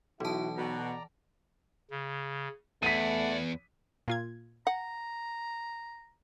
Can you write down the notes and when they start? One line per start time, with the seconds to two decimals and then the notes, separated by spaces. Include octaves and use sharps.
0.21 B1 E3 E4 F#4 A5 D#6
0.57 B2 D5 A#5
1.90 C#3
2.83 E2 A3 D5 F#5 B6 D#7
4.08 A#2 F4 G#6
4.67 F#5 A#5